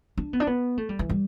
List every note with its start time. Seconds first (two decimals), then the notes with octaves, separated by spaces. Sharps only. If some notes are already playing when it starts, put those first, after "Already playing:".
0.18 D4
0.33 B3
0.40 D4
0.47 B3
0.78 A3
0.89 G3
0.99 E3
1.09 G3